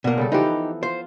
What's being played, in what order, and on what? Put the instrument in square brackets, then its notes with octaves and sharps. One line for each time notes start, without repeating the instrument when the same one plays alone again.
[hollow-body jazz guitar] B2 A#3 [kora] D4
[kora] C#3 G3 A4
[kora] E3 F3 B3 [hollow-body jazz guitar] D#4 G4
[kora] F4 [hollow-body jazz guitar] C5